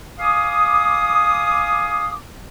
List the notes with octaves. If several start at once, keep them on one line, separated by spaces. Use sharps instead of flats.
F5 G#5 D6 D#6